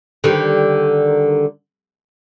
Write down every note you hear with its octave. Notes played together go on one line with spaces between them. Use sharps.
D3 D#3 G3